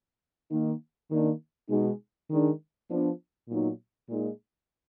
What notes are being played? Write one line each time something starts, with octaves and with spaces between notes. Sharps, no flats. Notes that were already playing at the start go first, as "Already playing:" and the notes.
D#3 A#3 D#4
D#3 A#3 D4
B2 G#3 D#4
D#3 G#3 D4
F3 B3 D4
A#2 F#3 B3 D#4
A#2 G#3 D#4